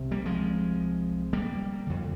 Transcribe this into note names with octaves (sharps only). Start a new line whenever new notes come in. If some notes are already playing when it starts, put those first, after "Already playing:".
Already playing: C2 C3
G3 A#3
F3 G#3
G3 A#3
F2 D3